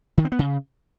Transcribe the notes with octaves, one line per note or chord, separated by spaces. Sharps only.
D#3
C4
B3
C#3